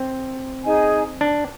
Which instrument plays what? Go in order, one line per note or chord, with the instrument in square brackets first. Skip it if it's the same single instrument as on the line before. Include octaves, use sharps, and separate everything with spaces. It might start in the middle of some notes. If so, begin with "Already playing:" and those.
Already playing: [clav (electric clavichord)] C4
[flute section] D#4 G#4 D#5 G#5
[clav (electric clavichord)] D4